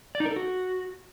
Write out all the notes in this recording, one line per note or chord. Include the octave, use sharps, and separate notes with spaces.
D5
D#4
A#4
A4
F#4